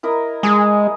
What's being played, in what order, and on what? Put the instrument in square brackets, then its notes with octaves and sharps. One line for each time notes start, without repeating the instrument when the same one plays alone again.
[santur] E4 A#4 D#5
[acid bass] G#3 [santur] G#4